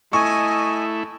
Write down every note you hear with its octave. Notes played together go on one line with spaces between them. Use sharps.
A3 E4 D#5 G#5 C#6